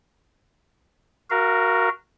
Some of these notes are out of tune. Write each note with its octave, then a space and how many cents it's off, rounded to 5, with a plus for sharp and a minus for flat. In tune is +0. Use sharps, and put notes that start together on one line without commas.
F#4 +0 A#4 +0 F5 -35